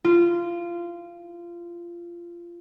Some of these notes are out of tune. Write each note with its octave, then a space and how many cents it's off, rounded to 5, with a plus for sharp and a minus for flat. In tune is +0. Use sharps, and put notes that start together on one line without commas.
F4 -20